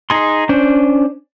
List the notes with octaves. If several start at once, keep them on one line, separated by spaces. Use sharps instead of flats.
D#4 G#4 C6
C#4 D4 C5